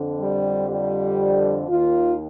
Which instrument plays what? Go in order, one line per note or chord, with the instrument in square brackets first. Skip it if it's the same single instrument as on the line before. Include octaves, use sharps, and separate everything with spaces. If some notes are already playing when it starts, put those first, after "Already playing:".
Already playing: [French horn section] F2 D3
G3
G3
D#2 D#3 F4